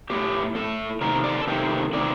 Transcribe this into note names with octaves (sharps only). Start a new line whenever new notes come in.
A2 A3 G4
A2 A3 A4
C3 D#3 A3 A#4
D5
A4
C3 D#3 A3 G4
C3 D#3 A3 D5